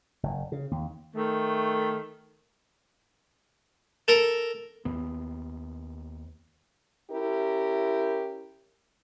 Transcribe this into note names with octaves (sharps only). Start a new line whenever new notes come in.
F#1
C#3
D#2
D#3 A3
A4 A#4
D#2 B3
C#4 E4 G4 A#4